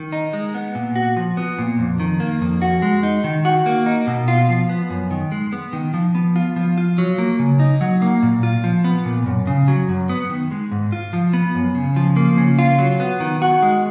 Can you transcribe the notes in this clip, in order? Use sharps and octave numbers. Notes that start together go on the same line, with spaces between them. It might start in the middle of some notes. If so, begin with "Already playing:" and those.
Already playing: D#3
D#4
G#3
B3
A#2
F#4
F3
B3
A#2
F2
D#3
A#3
F2
F#4
G#3
D#4
D#3
F#4
A#3
D#4
B2
F4
F3
B3
F#2
D#3
G#3
B3
D#3
F3
B3
F4
F3
F4
F#3
A#3
C#3
D#4
F#3
A#3
A#2
F4
F3
B3
A#2
F#2
C#3
F#3
F#2
B3
D#3
G#3
G#2
F4
F3
B3
F#2
C#3
F3
A#3
C#3
F4
F#3
B3
D#3
F#4
G#3